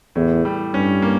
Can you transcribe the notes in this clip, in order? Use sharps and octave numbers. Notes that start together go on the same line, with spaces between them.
E2 A2
G3
G2 C#4
A#3